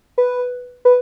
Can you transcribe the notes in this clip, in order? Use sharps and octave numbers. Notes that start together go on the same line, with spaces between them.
B4
B4